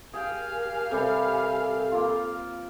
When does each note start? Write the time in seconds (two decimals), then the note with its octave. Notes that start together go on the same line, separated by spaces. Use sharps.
0.14 G4 G#4 A#4 F5 G5 G#5
0.91 C3 G3 A4
1.92 A#3 F4